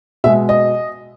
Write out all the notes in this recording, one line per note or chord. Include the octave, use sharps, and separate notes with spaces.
B2 G#3 E5
D#5